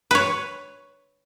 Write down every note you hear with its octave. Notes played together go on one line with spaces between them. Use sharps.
B4 C#5